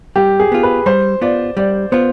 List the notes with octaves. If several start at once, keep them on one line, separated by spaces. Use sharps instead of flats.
G3 G4
G#4
B3 F4
B4
G3 C5
B3 F4 D5
G3 D5
B3 F4 C5